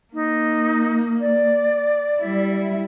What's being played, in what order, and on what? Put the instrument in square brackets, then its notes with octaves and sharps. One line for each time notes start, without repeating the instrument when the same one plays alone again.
[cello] A#3 [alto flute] D#4
[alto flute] D5
[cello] G3 E4